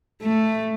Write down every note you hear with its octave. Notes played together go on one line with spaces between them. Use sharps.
A3